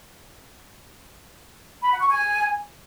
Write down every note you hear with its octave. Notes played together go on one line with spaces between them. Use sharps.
B5
F#5
C#6
G#5